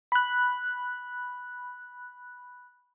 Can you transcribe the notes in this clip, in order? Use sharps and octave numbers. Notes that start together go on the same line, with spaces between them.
B5 F#6